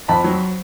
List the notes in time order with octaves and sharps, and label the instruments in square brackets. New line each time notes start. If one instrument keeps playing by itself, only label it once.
[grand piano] F2 A5 B5
F#3